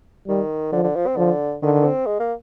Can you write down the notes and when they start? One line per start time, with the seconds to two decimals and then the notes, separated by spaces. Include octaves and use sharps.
0.27 D#3 G3
0.72 D3 F3
0.83 D3
0.95 F3
1.07 C4
1.17 D3 F3
1.62 D3 D#3
1.85 C4
2.06 G#3
2.20 A#3